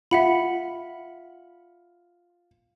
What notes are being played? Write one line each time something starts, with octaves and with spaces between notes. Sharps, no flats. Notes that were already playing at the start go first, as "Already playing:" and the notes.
F4 E5 F#5 B5